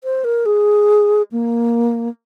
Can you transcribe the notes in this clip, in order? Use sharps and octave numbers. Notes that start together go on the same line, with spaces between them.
C5
A#4
G#4
A#3